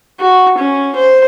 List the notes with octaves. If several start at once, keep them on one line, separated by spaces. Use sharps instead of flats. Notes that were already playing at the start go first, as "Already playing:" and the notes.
F#4
C#4
C5